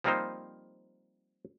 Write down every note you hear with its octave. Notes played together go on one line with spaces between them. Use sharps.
F3 G3 A#3 C4 D#4 C5